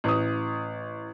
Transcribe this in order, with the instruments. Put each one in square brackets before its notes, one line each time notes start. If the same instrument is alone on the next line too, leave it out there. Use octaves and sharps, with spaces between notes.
[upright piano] A1 D#6